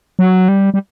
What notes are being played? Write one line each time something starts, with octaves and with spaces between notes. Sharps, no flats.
F#3
G3
G3